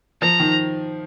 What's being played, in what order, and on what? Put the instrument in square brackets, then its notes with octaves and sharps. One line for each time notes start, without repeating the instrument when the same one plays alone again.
[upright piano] F3 [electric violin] A#5
[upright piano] D#3